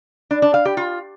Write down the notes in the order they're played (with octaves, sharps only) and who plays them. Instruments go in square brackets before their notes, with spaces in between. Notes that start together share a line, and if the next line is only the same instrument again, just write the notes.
[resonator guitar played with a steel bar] D4
D4
F5
G4
F4